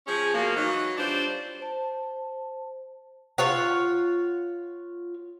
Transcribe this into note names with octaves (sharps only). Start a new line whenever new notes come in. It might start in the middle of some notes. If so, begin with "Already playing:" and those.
F3 C#4 G#4
B2 F3 A#3
E3 F#3 D#4
G3 D4 F4 C5
C5 A5
F4 C#5 F#5